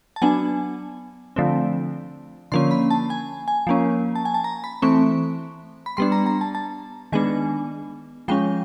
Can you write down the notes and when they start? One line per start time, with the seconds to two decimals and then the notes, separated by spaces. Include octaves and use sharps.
0.16 A5
0.22 F#3 B3 D4 G#5
1.36 D3 F3 A3 C4
2.52 D3 F3 A#3 C#4 C6
2.71 B5
2.90 A5
3.10 G#5
3.48 G#5
3.67 F3 A#3 C#4
4.15 A5
4.25 G#5
4.34 A5
4.44 A#5
4.64 B5
4.82 E3 A3 C4 C#6
5.86 B5
5.97 G3 B3 D4 C6
6.12 A#5
6.26 A#5
6.41 A5
6.55 A5
7.12 D#3 G#3 B3 D4 G#5
8.28 F3 G#3 C#4 G5